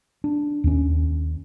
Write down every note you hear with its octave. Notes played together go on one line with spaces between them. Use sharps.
D4
D#2 C#4